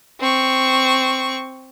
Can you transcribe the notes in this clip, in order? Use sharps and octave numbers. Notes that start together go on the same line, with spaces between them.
C4 C#6